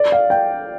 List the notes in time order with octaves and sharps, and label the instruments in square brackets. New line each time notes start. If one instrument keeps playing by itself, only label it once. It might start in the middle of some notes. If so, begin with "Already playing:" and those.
Already playing: [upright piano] D5
F5
G5